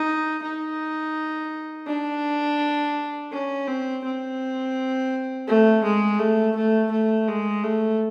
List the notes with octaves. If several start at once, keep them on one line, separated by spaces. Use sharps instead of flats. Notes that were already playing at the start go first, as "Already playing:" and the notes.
Already playing: D#4
D#4
D4
C#4
C4
C4
A3
G#3
A3
A3
A3
G#3
A3